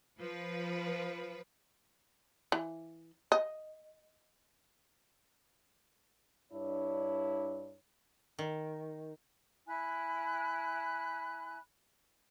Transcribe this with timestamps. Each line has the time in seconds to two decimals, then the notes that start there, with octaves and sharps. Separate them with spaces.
0.20 F3 B4
2.52 E3
3.32 D#5
6.52 G2 D4 E4 C#5
8.39 D#3
9.67 E4 G#5 B5 F#6